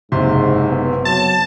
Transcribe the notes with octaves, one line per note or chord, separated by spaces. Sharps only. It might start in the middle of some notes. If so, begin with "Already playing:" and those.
F#1 G#2 C3 C6
B3
F#3 A5